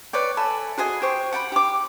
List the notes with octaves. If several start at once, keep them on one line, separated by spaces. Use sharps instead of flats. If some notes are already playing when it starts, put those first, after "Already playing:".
B4 C#5 D5 G5
A4 E5 G#5 B5
F#4 G#4 D#5 G#5
G4 C5 C#6
F#5 G5 A5 B5
G4 D6